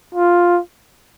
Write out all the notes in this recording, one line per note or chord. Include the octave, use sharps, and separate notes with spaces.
F4